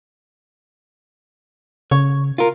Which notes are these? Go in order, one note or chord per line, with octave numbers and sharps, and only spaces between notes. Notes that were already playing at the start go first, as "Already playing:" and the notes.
C#3 C#5
F4 A#4